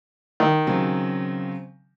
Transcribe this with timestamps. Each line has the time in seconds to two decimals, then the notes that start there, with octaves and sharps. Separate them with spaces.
0.40 D#3
0.67 C#3 F#3 C4